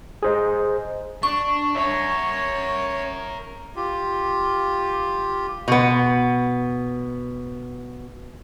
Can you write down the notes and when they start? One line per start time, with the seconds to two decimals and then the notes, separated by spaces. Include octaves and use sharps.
0.23 G#4 C5 D#5
1.23 D4 C#6
1.76 A#4 C#5 E5
3.76 F4 G4
5.68 B2 B3